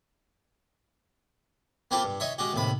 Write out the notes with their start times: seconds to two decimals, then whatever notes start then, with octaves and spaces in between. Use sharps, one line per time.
1.91 A#3 C4 E4 F4 G4 A4
2.04 G2
2.20 D#4 C#5 E5
2.38 G#3 C#4 F#4 G4
2.53 D#2 A2 C3 B5